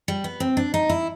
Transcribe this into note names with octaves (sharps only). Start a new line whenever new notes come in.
G3
B3
C4
D4
D#4
E4